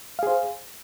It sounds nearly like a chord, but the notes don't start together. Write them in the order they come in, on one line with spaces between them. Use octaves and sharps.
F5 G#4 C5